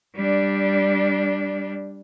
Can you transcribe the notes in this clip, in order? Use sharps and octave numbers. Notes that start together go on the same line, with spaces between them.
G3 D4